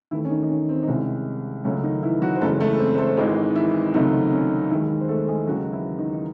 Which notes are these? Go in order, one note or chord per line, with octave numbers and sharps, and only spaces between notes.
D#2 D#3 E3 A3 E4
C#4
D#3 D#4
D#4
C#4
C4
D#4
C2 C3 D#3 G#3 C#4
C#2 C#3 F#3 A3 C#4
D#3 D#4
E3 E4
F#3 F#4
C5
F#1 E2 C#3 G#3 A3 A4
A3 A4
C4 C5
C5
A3 A4
G#1 G#2 D#3 E3 G#3 D#4
E3 E4
C#2 C3 D#3 F#3 A3 D#4
C#4
D#2 D#3 E3 G#3 E4
C5
A3 A4
G#3 G#4
D#2 C#3 F#3 G#3 F#4
E3 E4
D#3 D#4
D#4